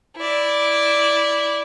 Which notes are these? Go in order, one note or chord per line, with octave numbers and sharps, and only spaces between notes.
E4 D5